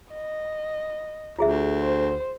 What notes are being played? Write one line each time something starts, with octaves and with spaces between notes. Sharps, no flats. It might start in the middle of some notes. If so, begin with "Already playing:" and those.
D#5
D2 F4 G#4 E5
C5